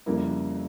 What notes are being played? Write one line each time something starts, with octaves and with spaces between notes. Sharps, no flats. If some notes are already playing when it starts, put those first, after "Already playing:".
F2 C#3 G3 A#3 E4